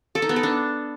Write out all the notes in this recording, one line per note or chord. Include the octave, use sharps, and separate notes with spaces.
A4
D#4
B3
A4
D4